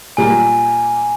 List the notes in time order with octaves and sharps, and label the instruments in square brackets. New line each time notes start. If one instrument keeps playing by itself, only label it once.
[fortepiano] A#2 G3 A#3 [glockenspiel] G#5